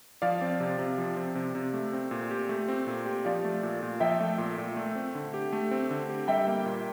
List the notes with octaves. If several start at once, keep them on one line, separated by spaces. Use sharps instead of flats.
F3 D5 F5
C4
C3
C3
F3
C4
C3
C3
A3
C4
A#2
G4
A3
C4
A#2
G4
F3 D5 F5
A3
A#2
A#2
F3 E5 G5
A3
A#2
A#2
A3
C4
D3
G4
A3
C4
D3
G4
G3 E5 G5
A#3
A#2